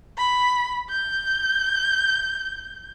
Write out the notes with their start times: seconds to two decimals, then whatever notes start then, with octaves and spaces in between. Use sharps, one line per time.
0.18 B5
0.90 G6